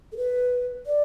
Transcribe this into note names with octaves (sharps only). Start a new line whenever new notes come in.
A4
B4
D5